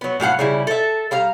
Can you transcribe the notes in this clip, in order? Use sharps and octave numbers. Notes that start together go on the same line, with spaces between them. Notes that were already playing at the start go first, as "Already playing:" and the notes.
F#3 B3
A2 F#3 F5 F#5
C#3 G3 E4
A4 E5
G3 F5 A#5